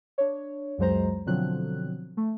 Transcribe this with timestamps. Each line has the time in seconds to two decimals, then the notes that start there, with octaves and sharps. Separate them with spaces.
0.18 D4 C#5
0.78 C#2 F#2 F#3 G#3 C5 A#5
1.26 B2 D3 F3 F#3 C4 F#6
2.17 A3